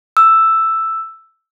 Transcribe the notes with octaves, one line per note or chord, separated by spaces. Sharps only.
E6